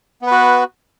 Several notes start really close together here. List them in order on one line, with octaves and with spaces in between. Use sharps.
B3 B4 F#4